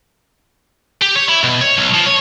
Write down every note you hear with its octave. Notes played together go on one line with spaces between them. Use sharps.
G4
C#5
E4
B2
C#5
B1
F3
C#5